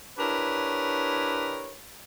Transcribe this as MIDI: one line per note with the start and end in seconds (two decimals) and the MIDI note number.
0.18 1.75 62
0.18 1.75 64
0.18 1.75 67
0.18 1.75 70
0.18 1.75 71
0.18 1.75 73